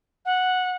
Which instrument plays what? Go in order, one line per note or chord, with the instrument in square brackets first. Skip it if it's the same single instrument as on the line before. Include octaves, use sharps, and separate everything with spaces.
[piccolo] F#5